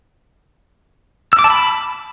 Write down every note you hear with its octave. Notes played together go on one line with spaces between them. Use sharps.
E6
D6
A5
B5